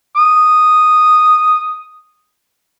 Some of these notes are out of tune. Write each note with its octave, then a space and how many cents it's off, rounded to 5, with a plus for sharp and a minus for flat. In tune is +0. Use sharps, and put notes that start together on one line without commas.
D#6 -5